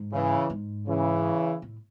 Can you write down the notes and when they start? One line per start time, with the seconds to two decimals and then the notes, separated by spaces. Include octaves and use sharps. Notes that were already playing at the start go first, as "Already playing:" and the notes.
Already playing: G#2
0.13 C#3 E3
0.50 G#2
0.87 C#3 E3
1.62 A2